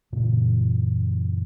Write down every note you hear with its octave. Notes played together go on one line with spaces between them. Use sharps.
F#2 A#2 C#3 E3